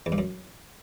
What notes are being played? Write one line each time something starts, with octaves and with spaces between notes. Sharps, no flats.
E2
G2
F#2